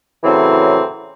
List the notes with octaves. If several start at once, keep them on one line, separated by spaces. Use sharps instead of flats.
A2 C#3 E3 F#3 C4